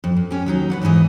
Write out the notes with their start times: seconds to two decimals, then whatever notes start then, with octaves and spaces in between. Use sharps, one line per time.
0.04 F2
0.17 F2
0.31 C#4 G4
0.46 D#2 F#3 D#4
0.70 B4 D5 F#5
0.82 E2 G#2 C3 E3 D#5